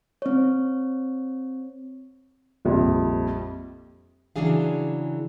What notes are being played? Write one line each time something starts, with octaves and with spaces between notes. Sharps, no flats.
C4 C#5
A#1 F2 G3
C#3 E3 F#3 D4 G#4 F5